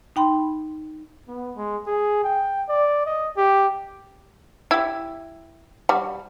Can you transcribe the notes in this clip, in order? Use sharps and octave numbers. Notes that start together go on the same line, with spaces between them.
D#4 G5 B5 C6
B3
G#3
G#4
G5
D5
D#5
G4
E4 G4
G3 F#4